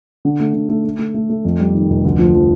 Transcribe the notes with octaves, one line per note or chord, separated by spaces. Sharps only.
D3
A3
D3
A3
A3
A3
A3
A3
F2
G3
D#3
F1
D2
F3
F3